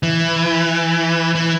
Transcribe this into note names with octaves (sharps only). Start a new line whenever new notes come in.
E3
E3